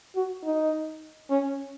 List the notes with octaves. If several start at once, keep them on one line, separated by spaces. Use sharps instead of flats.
F#4
D#4
C#4